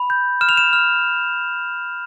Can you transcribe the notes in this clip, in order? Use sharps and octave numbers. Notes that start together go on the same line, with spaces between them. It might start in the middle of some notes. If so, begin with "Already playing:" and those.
Already playing: B5
G6
F6 E7
F7
E7
F6